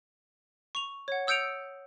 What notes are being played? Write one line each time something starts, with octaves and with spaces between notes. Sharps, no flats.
C#6 F7
C#5 F#5
D#6 E6 G6 C#7 D7 F7